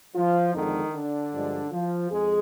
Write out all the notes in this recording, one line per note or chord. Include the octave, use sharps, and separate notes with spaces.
F3 F4
F2 D3 D#3 G#3 D#4
D3 D4
G2 F3 G#3
F3 F4
F2 G#3 G#4